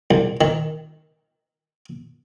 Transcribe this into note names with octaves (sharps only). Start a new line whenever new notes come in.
C2
D#3